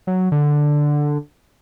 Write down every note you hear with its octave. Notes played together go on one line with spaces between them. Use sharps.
F#3
D3